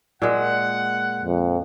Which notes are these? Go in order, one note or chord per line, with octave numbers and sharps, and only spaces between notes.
A#2 G#3 F#5
F2